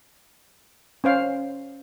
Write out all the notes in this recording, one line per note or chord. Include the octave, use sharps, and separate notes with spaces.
C#4 C5 F5